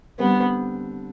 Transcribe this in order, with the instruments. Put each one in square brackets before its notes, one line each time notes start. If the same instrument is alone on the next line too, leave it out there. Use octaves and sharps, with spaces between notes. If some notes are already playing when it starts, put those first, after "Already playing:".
[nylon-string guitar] D3 G3 C4 [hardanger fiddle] B3